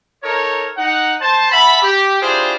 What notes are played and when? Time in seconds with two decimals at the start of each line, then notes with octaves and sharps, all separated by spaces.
0.23 D#4 A4 A#4 C#5
0.78 D#4 F#5
1.21 C5 A5
1.52 E5 F#5 A5 B5
1.83 G4
2.22 D4 E4 F4 G4 G#4 C5